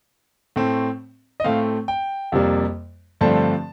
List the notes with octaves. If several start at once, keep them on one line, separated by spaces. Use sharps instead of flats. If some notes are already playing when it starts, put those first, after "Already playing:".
A2 A3 C4
D#5
A2 A3 C4 F5
G5
F2 C3 G3 A#3
G2 D3 F3 A3 C4 A5